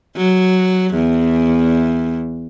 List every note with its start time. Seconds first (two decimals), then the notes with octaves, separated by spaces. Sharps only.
0.16 F#3
0.94 E2